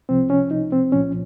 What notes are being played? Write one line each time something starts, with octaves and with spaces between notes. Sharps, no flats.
C2 C3 F3 C4
C#4
D#4
C4
C2 A#2 F3 C#4